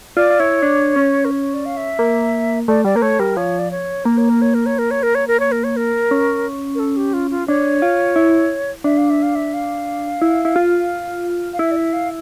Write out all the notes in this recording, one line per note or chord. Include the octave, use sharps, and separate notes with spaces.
F4 D5
F4
E4 C#5
D4
C#4
A#4
C#5
D5
F5
E5
A#3
A3 D5
G3 D5
A#3 A#4
A3 C#5
G3 A#4
F3 C#5
D5
C#5
A#3 A#4
C#5
A#4
C#5
A#4
C#5
A#4
C#5
A#4
C#5
A#4
C#5
A#4
C#5
A#4
C#4
A#4
A4
G4
F4
F4
D4 C#5
F4
E4
D4 E5
F5
E5
F5
E5
F5
E4
E4
F4
F5
E4 E5
D5
E5
F5